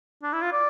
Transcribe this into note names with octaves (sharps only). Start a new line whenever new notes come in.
D4
E4
F4
D5